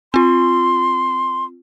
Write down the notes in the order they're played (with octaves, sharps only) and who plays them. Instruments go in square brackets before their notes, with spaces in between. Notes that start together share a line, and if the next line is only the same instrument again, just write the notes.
[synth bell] C4 F4 [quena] C6